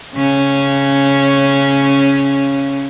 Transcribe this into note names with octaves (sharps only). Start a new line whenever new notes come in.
C#3 C#4